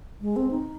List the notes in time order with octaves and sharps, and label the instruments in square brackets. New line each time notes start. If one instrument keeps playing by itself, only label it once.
[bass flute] G#3
C4
D#4